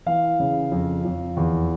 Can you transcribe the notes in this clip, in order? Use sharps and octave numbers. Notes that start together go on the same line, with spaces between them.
E3 F5
C#3
F2
F2
E2